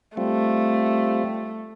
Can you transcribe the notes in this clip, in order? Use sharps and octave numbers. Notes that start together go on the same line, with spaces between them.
G3 A3 C4 F4